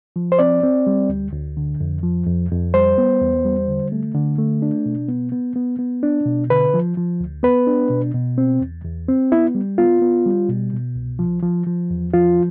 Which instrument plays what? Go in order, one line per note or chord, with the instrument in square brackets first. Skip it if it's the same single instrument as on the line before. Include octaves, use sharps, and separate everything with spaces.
[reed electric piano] F3
C5
C4 D5
C4
G3
D2
D2
D3
F2
F3
F2
F2
G3 C5
B3
E2
G3
D3
A3
D3
A3
D4
B2
B3
B3
B3
B3
D4
B2
D3 B4
F3
F3
D2
B3 B4
D4
B2
B2
C4
E2
E2
C4
B3 E4
G3
B3 F4
B3
G3
B2
B2
C2
F3
F3
F3
E2
F3 F4